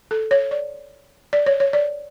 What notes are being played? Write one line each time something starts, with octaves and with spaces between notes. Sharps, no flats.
A4
C#5
D5
D5
C#5
C#5
D5